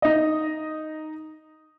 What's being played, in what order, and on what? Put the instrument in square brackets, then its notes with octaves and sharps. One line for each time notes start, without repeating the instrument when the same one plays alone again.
[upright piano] D#4 D#5